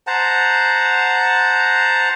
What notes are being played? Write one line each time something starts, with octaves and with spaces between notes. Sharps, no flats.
C5 F#5 A5 A#5